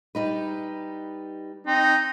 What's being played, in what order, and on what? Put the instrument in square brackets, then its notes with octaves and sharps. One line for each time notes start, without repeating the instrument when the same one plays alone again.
[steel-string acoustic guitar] G3 D#4 B4
[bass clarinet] C4 [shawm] D#4